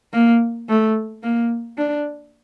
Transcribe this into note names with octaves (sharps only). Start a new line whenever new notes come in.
A#3
A3
A#3
D4